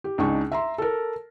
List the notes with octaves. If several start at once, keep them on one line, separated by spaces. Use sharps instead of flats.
G4
C#2 D4 D#4 G#5 C#6
E5 A#5 C6
A4 A#4